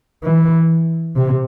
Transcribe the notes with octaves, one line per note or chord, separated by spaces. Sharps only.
E3
C3